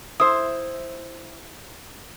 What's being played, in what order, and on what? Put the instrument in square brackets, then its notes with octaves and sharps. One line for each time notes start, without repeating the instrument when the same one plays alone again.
[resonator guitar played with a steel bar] E4 C5 [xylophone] D#6